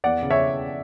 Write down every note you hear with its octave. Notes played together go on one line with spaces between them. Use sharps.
E2 D5 F#5
C#3
C#5 E5